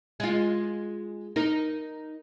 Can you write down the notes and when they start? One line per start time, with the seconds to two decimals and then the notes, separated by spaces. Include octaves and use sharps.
0.20 G#3 F4
1.36 D#4 A#4